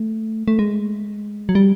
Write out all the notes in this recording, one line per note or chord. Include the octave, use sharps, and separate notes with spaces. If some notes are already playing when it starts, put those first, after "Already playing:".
Already playing: A3
A3
G#3
F#3
G3